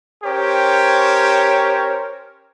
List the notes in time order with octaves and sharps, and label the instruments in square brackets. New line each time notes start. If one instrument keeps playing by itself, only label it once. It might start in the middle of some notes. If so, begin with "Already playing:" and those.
[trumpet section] C#4 G4 A#4 C5 C#5